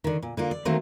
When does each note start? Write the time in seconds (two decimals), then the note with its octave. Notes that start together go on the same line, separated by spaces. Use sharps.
0.04 D3 D#3
0.22 A#2
0.37 D3 A#3 F4
0.51 D5
0.65 D#3 F#3 A3 A#3 C4